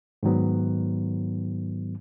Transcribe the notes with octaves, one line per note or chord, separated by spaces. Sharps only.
G#2 D#3 F#3 B3